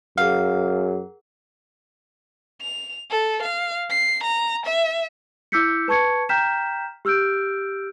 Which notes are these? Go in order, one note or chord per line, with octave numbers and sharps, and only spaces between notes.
F#2 G#4 A#4 F5 F#5
F7
A4
F5
C7
A#5
E5
E4 D6 E6 G6 B6 C#7
B4 A5 C#6 G#6 C#7
G5 A#5 F6 G6 B6 E7
G4 E6 F6 G6 D7